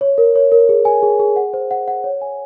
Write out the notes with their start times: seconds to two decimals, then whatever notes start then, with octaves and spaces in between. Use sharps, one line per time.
0.01 C#5
0.18 A#4
0.35 C#5
0.52 A#4
0.69 G#4
0.85 G#5
1.03 G#4
1.19 G#4
1.36 F#5
1.54 C5
1.71 F#5
1.88 F#5
2.04 C#5
2.21 G#5